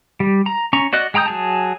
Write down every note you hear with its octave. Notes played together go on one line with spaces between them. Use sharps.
G3
A#5
C#4 A#5 C#6
F#4 D5 D#5 F#6
G#3 G5 A#5 D#6 G6
F#3 G#4 A5